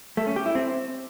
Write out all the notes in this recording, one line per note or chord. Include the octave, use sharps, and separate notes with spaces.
A3
C#4
G4
E4
C4